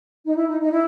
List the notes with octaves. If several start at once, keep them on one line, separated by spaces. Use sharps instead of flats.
D#4
E4
D#4
D#4
E4